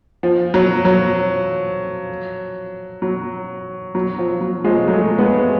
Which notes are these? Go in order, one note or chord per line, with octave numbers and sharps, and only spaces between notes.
F3
F#3
F#3
F#3
F#3
F3
F#3
F3 G#3
F#3 A3
G#3 B3